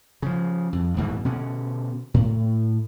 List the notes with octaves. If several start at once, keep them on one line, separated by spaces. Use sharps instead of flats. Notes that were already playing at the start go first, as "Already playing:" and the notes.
C#3 F3
F2
D#1 G#2 B2 E3
B2 D3 C#4
A2